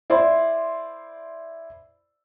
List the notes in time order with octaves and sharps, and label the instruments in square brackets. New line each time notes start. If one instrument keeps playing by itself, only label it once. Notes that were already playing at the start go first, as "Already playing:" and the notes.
[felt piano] E4 C5 D5 C6